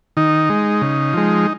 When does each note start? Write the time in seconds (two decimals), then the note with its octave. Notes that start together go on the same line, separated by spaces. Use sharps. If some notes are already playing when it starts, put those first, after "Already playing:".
0.17 D#3 D#4
0.50 G#3
0.81 C#3
1.13 F3 G#3